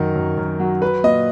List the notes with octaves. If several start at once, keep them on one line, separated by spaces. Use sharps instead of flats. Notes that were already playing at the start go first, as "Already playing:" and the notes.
Already playing: F#2 D#3 F#3 A#4
F#2
F#2
F#3
F#3 B4
A#2 D#5